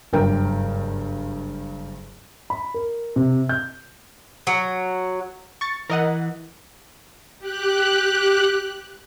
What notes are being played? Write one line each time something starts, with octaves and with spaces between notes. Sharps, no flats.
F#1 G2 A#4 G5
B5
A#4
C3
G6
F#3
C#6 A6
E3 A#4 D#5 F#5
G4 F#6